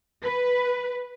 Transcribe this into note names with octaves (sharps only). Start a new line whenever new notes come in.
B4